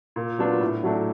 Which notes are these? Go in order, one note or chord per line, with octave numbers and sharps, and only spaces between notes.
A#2
F#3 B3 D4 F4
A2
F#3 A3 D4